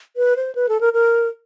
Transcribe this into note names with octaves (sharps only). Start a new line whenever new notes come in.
B4
C5
B4
A4
A#4
A#4